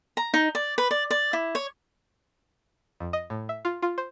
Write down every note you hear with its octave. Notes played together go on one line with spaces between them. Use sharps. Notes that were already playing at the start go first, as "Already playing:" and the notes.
A#5
D#4
D5
B4
D5
D5
E4
C#5
F2
D#5
A2
E5
F4
F4
C5